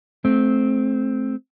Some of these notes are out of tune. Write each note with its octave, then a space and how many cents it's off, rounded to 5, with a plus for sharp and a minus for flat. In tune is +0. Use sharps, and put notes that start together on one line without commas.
A3 -30 C4 +0